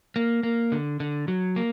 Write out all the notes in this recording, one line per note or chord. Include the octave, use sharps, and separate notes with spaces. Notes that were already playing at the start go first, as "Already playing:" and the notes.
A#3
A#3
D3
D3
F#3
A#3